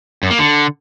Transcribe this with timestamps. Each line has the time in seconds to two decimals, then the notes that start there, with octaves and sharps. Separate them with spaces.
0.23 F#2
0.31 A#3
0.39 D3